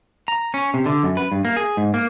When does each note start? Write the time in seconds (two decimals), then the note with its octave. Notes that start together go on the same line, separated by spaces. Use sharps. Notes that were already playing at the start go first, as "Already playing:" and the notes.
0.28 A#5
0.54 C#4
0.74 C3
0.86 D3
1.03 F#2
1.17 B4
1.32 G2
1.45 A#3
1.57 G#4
1.77 G#2
1.94 A#3